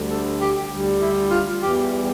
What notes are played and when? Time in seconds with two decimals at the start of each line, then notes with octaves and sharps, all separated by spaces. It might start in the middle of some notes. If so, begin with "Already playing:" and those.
Already playing: D2 D3 G3
0.09 A4
0.40 G4
0.69 D2 D3 G3
1.00 E4
1.30 F4
1.60 E2 E3 G3 G4